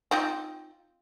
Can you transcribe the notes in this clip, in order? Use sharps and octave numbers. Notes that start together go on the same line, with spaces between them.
C4 D#4 F4